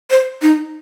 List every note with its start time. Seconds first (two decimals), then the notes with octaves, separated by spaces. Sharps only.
0.11 C5
0.42 D#4